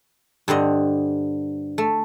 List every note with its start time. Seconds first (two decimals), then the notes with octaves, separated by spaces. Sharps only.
0.48 G2 D3 C4 D#5
1.78 A3